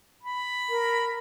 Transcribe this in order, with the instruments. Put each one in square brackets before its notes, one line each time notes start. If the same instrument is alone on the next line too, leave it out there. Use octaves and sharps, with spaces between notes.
[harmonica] B5
[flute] A#4